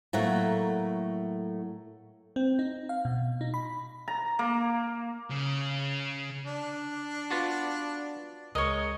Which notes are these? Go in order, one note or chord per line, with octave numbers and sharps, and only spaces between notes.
A2 F#3 A3 A#3 F#5
C4
D#4
F5
B2
D#4
B5
A#5
A#3
C#3
D4
B3 F4 F#4 D6 A6
C#2 G#3 A#4 C#5 D#5